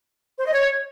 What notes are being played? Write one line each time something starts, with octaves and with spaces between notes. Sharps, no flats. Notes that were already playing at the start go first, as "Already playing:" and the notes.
C5
D#5
C#5